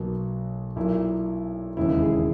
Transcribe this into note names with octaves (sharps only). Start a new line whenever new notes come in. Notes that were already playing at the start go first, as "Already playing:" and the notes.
Already playing: B1 B2 F#3 A#3 F#4
B1 A#2 F#3 A#3 E4
E1 D#2 C#3 G#3 E4
G#4